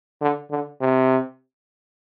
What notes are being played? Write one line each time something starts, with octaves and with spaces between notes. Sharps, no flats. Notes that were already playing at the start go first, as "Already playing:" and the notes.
D3
D3
C3